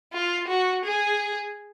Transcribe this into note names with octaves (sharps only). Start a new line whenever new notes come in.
F4
F#4
G#4